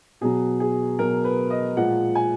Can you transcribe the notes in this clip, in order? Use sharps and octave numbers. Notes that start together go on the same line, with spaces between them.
B2 F#3 G#4
G#4
B2 F#3 A#4
B4
D#5
A#2 F3 G#3 F#5
G#5